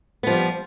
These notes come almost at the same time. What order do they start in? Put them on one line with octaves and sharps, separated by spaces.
B3 F3 G3